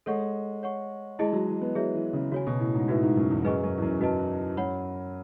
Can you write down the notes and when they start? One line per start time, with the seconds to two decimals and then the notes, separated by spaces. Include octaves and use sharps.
0.06 G#3 A4 C#5 F#5 C#6
0.63 C#5 F#5 C#6
1.19 G#3 E4 G#4 D#5 A5
1.33 F#3
1.47 E3
1.62 B3
1.75 F#3 G#4 C#5 E5
1.95 E3
2.13 C#3
2.32 C#3 F#4 C#5 G#5
2.47 B2
2.60 A2
2.75 G#2
2.88 A2 D#4 F#4 B4 E5
3.03 G#2
3.17 F#2
3.30 E2
3.45 F#2 G#4 B4 D#5 G#5 C#6
3.63 F#2
3.78 E2
3.82 F#2
4.01 F#2 F#4 B4 D#5 A5
4.57 F#2 C#5 F#5 B5